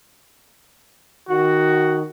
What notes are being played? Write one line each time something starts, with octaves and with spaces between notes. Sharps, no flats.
D#3 F#4